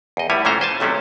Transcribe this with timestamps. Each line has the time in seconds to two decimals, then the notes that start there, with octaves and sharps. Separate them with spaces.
0.17 E2 D#5
0.30 A2 G3 E4 C#5 G#5
0.45 A#2 E3 A3 C#4 C5 A#5
0.61 C5 G#5 A5
0.80 B1 C3 A3 C#4 D4